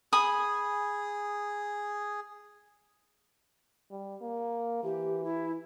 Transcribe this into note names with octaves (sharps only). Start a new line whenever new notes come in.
G#4 G#5 B5 D#6
G3
A#3
E3 G4
E4